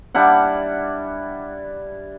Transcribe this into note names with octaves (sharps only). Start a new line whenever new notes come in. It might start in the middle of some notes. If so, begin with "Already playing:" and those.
G3 D4 E4 F#5